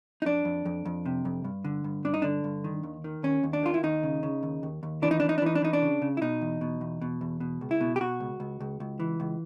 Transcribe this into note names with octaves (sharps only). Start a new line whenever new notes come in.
D#4
F2 D4
F2
F2
F2
C3
F2
G2
D3
G2
G2 D4
D#4
D3 D4
G2
D#3
D#2
D#3
D#2 C#4
D#2
D4
D#3 F4
E4
D#2 D#4
C#3
C#3
D#2
D#2
D#2
E3 D4
D#4
E3 D4
D#4
D4
E3 D#4
D4
E3 D#4
D4
C#3
C#3
E4
B2 D#4
E2
B2
E2
B2
E2
B2
C#2
E4
B2
G4
B2 F#4
C#2
C#2
C#2
C#2
E3
C#2